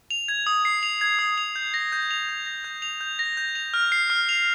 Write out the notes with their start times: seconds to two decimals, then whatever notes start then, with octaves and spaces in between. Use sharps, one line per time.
0.11 F7
0.28 G#6
0.47 D#6
0.65 C7
0.83 F7
1.01 G#6
1.19 D#6
1.38 F7
1.56 G6
1.74 A#6
1.92 G6
2.11 F7
2.29 G6
2.46 A#6
2.64 G6
2.82 F7
3.01 G6
3.19 A#6
3.37 G6
3.55 F7
3.74 F6
3.92 C7
4.10 F6
4.29 F7